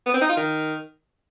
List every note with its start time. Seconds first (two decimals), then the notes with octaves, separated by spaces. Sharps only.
0.06 B3
0.14 C4
0.21 D#4
0.29 F4
0.37 D#3